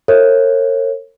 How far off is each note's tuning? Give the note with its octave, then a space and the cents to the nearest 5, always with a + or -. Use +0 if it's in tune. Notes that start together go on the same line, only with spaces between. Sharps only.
A#4 -40 C#5 -35 E5 +15